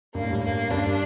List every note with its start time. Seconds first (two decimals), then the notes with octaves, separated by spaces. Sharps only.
0.14 G2 A#3
0.23 A2
0.33 G2
0.43 A#3
0.71 G2 D4